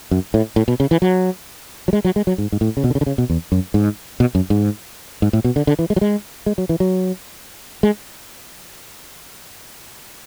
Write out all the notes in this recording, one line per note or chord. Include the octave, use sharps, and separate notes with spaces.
F#2
A2
A2
B2
C#3
E3
F#3
F#3
G#3
F#3
G#3
F#3
G#2
G#2
A2
C#3
B2
D3
C#3
D3
C#3
B2
E2
F#2
G#2
B2
F#2
G#2
G#2
A2
B2
D3
D3
E3
G#3
F#3
G#3
G#3
F#3
E3
F#3
G#3